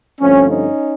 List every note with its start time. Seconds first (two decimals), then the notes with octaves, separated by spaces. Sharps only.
0.20 G2 D3 F3 A3 C4 C#4
0.49 C#4 D#4